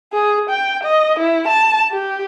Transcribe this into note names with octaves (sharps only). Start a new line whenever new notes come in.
G#4
G5
D#5
E4
A5
G4